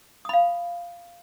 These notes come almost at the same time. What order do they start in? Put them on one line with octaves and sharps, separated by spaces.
D#6 B5 F5